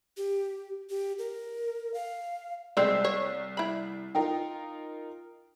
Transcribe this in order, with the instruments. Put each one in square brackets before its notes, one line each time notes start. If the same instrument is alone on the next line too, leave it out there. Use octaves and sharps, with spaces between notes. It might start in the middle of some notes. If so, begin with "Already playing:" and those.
[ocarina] G4
G4
A#4
F5
[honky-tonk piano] C2 E6 C7 [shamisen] G#3 A3 C4 [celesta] D5
[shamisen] C#5
E4 B5
[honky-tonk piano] D#4 F4 A#4 [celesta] G5